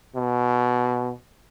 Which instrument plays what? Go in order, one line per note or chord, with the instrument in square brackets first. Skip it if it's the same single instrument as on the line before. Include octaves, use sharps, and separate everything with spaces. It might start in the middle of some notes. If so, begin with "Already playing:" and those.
[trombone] B2